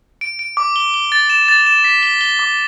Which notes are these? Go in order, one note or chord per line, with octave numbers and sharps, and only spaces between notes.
D7
D7
D6
G7
G7
A6
E7
A6
E7
B6
G7
G7
D6